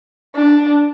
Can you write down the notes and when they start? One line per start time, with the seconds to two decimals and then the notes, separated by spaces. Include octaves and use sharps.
0.35 D4